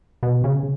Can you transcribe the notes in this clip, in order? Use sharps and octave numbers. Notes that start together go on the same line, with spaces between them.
B2
C#3